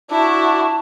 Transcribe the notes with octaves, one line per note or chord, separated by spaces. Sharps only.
D4 E4 F#4 A5